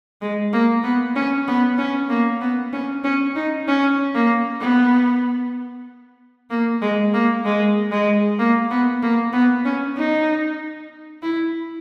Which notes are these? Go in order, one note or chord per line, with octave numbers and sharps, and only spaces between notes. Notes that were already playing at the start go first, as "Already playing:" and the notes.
G#3
A#3
B3
C#4
B3
C#4
A#3
B3
C#4
C#4
D#4
C#4
A#3
B3
A#3
G#3
A#3
G#3
G#3
A#3
B3
A#3
B3
C#4
D#4
E4